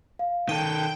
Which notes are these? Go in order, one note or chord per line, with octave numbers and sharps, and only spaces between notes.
F5
D#3 A4 G5 D#7